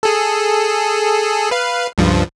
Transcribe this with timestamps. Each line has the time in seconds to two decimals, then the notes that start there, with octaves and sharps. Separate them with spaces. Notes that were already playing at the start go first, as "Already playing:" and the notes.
0.03 G#4 A4
1.51 B4 F5
1.98 C#2 G2 F3